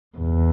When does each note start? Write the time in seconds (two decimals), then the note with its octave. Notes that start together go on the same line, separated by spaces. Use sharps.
0.18 E2